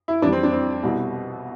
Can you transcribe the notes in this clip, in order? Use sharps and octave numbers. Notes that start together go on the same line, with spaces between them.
E4
F2 E3 G3 D4
C4
D4
C4
C2 B2 G3